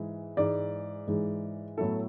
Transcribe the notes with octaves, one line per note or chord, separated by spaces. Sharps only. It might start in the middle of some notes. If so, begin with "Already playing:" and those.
Already playing: G#2 E3 G#3
G#2 E3 G#3 D5
G#2 E3 G#3
A2 F#3 B3 E4 A4